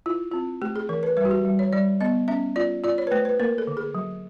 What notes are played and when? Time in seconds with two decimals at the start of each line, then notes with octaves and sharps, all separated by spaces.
0.06 E4 F4
0.31 C4 F4
0.62 A3 G4
0.76 G#4
0.89 E3 A#4
1.03 B4
1.17 G3 B4
1.25 F#4
1.31 G4
1.45 G3
1.59 C#5
1.73 G3 D5
2.01 B3 D#5
2.28 C#4 E5
2.56 F4 D5
2.84 F4 D5
2.98 C#5
3.07 B4
3.11 A3 C5
3.25 B4
3.40 A#3 A#4
3.58 A4
3.67 D3
3.77 G#4
3.95 F#3